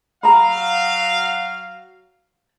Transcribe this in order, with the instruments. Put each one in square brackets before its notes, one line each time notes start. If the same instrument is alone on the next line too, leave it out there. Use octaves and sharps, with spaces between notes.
[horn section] F#3 F#4 F5 [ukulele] A#5 B5